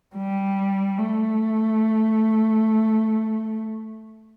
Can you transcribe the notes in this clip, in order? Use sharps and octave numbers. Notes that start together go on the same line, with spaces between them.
G3
A3